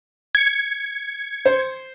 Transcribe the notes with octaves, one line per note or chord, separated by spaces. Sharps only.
G#6 C#7
C5